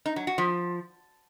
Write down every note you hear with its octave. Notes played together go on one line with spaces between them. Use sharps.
D#4
F#3
F#4
F3